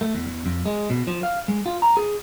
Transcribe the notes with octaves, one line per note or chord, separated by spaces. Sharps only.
A3
E2
E2
F2
G#3
B2
F3
F5
G#3
F4
A#5
G#4